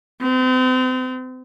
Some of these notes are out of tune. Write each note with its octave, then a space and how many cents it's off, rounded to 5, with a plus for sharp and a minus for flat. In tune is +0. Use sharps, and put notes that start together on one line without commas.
C4 -40